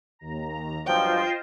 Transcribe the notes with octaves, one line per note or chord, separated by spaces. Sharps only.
D#2 A#5
G2 F3 F#3 F4 C5 D#5 G5